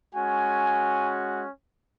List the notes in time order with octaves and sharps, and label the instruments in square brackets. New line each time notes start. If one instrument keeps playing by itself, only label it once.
[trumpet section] G#3 C#4 F#4 G#5